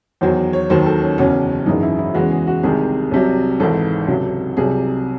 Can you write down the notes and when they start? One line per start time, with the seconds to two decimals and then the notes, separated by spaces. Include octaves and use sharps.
0.21 E2 D#3 F#3 C5
0.53 C#5
0.70 D#2 D#3 F#3 C5
0.86 A4
1.02 C#4
1.18 F#1 E2 C#3 F#3 C#4
1.66 G#1 F#2 E3 G#3 D#4
1.83 E4
1.99 E4
2.14 E2 C#3 E3 G#3 F#4
2.31 G#4
2.47 F#4
2.63 C2 C3 D#3 G#3 G#4
3.11 C2 C3 F#3
3.60 G#1 G#2 E3 A4
4.08 C#2 C3 F#3
4.57 C2 C3 F#3 G#4